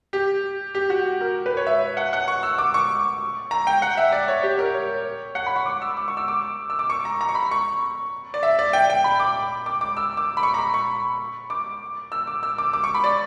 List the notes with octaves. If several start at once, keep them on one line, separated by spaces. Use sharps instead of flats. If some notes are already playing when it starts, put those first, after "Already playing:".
G4
G4
F#4
A#4
B4
C#5
E5
F#5
F#5
C#6
E6
D6
C#6
A#5
G5
F#5
E5
D5
C#5
G4
A#4
C#5
F#5
B5
C#6
D6
E6
D6
C#6
E6
D6
E6
D6
C#6
A#5
A#5
C#6
B5
C#6
D5
E5
D5
G5
G5
B5
D6
D6
D6
E6
D6
B5
C#6
A#5
B5
C#6
D6
E6
D6
E6
D6
D6
C#6
B5
D5